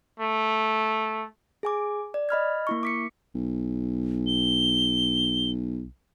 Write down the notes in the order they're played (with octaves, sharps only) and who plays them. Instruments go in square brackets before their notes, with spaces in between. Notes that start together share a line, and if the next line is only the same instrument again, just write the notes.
[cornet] A3
[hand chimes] G#4 G#5 D6
D5
D#5 B5 F6 G#6
A#3 E4 C#6
D6 B6 C#7
[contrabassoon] B1
[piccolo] G7